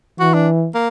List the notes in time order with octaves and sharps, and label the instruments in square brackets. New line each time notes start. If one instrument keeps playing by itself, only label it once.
[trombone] E3 [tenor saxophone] F#4
[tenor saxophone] D4
A#3